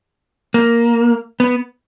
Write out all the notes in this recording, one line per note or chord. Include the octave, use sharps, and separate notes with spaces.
A#3
B3